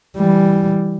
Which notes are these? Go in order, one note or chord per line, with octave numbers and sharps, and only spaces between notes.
E3 G3